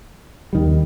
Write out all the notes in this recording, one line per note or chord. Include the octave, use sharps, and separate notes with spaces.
D#2 D#3 G3